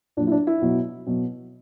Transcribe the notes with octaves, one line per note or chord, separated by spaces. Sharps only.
A#2 F#3 D4
E4
D4
E4
B2 F#3
B2 F#3